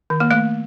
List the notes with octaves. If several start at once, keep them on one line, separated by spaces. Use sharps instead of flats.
D#3
A#3
A3